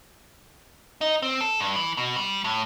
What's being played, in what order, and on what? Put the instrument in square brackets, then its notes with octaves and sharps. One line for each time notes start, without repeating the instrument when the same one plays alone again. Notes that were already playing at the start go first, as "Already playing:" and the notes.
[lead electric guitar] D#4
C4
A4
G2
E3
B2
G3
A2